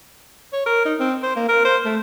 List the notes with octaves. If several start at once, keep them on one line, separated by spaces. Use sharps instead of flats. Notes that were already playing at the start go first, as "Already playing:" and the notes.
C#5
A#4
D#4
C4
C5
A#3
A#4
C5
A3